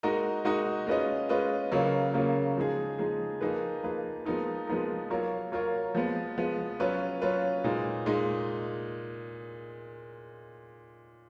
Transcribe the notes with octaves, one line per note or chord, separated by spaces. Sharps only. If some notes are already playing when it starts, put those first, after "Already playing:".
G#3 D#4 F#4 A#4 D#5
G#3 D#4 F#4 A#4 D#5
G#3 C#4 F4 B4 D#5
G#3 C#4 F4 B4 D#5
C#3 F#3 A#3 C#4 F4
C#3 F#3 A#3 C#4 F4
F3 G#3 D#4 G#4
F3 G#3 D#4 G#4
F3 A#3 D#4 G#4 B4
F3 A#3 D#4 G#4 B4
F3 G#3 B3 D#4 A#4
F3 G#3 B3 D#4 A#4
F#3 A#3 F4 A#4 C#5
F#3 A#3 F4 A#4 C#5
F3 G#3 B3
F3 G#3 B3
F#3 C#4 F4 B4
F#3 C#4 F4 B4
A#2 G#3 D#4
A#2 G#3 D#4